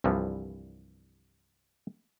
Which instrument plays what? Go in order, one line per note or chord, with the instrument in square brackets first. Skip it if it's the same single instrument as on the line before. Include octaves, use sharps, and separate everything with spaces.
[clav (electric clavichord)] C2 G2 E3 F3